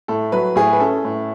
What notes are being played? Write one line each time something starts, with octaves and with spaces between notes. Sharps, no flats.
A2 A4
F#3 B4
A2 G#4
B4
C#4 A4
A2